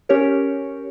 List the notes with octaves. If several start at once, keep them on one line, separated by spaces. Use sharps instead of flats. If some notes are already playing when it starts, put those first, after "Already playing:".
C#4 G4 A#4 C#5